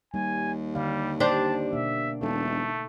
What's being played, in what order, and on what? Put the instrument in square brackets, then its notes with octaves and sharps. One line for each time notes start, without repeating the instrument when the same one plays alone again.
[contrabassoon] D#2 [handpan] G3 [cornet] G#5
[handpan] D3 D5 F5 [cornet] G3
[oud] D4 G4 C5 [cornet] A5
[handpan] B2 A#3 [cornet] E5
[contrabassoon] E1 [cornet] A3 [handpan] D#4 A4